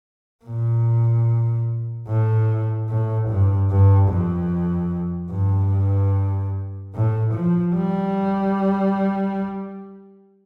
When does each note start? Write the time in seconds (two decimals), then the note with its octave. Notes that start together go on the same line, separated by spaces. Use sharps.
0.44 A#2
2.07 A2
2.89 A2
3.29 G2
3.70 G2
4.09 F2
5.31 G2
6.94 A2
7.34 F3
7.74 G3